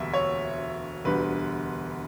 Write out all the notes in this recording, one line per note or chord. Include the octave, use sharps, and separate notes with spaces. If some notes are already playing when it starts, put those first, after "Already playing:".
Already playing: E1 D2 G3 E5
C#5
E1 D2 D3 G3 B4